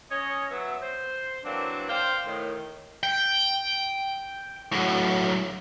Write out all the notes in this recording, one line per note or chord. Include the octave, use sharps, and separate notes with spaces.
C#4 C#5 D#5
F#3 B3 E5
C5
E3 F#3 A#3 C4 D4
C5 F5 G5
A2 D#3
G5
A2 F#3